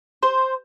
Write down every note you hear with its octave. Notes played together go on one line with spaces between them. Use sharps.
C5